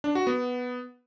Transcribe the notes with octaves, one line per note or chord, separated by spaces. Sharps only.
D4
F#4
B3